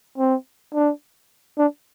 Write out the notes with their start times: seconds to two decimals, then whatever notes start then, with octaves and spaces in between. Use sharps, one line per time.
0.18 C4
0.74 D4
1.58 D4